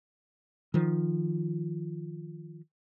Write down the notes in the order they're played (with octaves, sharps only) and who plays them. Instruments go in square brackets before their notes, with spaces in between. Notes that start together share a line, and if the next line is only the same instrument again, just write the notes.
[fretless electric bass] D#3 F3